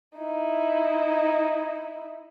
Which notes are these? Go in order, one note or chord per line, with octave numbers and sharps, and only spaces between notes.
D#4 E4